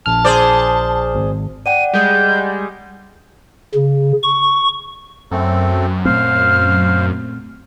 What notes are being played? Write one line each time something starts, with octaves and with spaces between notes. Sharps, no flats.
A#1 A5 F6
G#4 C5 D5
G#1
D5 F#5 G5 D#7
G3 G#3 G6
C#3
C#6
F#2 A3 C4 A4
A#2 A3 C4 C5 F5 F6